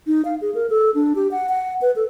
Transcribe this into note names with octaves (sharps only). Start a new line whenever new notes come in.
D#4
F5
G#4
A#4
A4
D4
G4
F#5
F#5
B4
A4